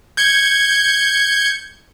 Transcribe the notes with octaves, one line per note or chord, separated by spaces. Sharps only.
G6 G#6 C#7